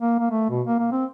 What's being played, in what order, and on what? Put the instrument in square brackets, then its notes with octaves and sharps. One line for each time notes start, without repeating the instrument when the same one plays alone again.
[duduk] A#3
A#3
A3
B2
A#3
A#3
C4